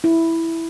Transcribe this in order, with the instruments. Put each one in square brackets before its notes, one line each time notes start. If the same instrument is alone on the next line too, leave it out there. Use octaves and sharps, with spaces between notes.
[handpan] E4